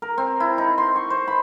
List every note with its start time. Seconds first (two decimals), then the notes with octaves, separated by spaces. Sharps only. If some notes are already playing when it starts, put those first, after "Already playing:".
0.02 A#4
0.18 C4
0.40 E4
0.58 D#4
0.78 C6
0.96 C#6
1.10 C5
1.28 B5